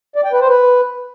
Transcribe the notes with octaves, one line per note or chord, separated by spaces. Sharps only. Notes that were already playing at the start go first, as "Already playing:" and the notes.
D5
G5
B4
C5
B4